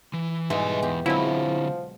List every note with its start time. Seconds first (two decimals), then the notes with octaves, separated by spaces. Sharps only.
0.14 E3
0.50 G#2 B2 E3 G3 G#3 E5
0.82 E2 G4
1.06 D3 F3 F#3 G#3 C4 E4